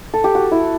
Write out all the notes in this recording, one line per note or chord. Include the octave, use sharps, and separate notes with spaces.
A4
G4
F#4
E4